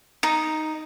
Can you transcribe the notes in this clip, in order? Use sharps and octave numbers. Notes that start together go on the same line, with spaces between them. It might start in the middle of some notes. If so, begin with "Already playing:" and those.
D#4